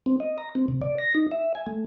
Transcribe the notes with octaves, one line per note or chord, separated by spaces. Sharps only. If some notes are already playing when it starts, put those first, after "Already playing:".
C4
D#5
A#5
C4
C3
D5
A#6
D#4
E5
G#5
A3